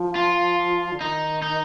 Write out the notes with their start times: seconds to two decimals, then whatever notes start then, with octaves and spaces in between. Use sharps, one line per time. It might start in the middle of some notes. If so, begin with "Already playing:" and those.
Already playing: F3
0.16 F4
0.93 D3
1.00 D#3 D#4
1.42 D#4